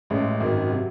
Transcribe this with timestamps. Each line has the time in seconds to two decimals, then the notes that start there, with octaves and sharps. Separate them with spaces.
0.10 A1 A2 G#3 C#4
0.40 G#1 F#2 D#3
0.70 C3 F#3